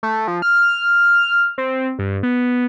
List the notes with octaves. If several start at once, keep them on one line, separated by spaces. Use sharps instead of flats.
A3
F3
F6
C4
G2
B3